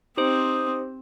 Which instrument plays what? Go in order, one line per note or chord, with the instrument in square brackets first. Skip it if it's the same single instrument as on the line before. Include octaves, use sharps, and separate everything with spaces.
[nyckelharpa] C4 [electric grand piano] D#4 [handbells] G4 C5 [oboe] D#6